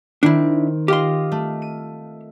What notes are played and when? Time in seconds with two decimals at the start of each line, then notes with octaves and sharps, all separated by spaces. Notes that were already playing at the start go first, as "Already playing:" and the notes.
0.23 D#3 C4 D4 E4 C#7
0.88 F4 G4 D#5 F5 C6
1.32 A3
1.62 D#7